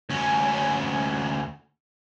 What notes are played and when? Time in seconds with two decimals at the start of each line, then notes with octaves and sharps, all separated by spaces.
0.10 D2 C#4